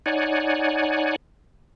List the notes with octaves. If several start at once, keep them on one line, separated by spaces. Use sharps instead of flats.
D#4 C#5 D5 F#5 G#5